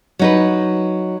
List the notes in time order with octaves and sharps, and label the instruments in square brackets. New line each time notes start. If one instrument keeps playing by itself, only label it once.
[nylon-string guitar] F#3 D#4 B4